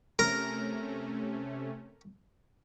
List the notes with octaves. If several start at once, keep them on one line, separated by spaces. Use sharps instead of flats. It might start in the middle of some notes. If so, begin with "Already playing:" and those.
C3 A3 C#4 A#4